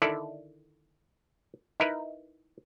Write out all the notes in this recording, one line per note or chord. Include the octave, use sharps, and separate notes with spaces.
D3 D#3 E4 A4 D5
D#4 E4 A#4 B4